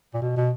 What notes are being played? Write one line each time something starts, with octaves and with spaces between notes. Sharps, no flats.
A#2
B2
B2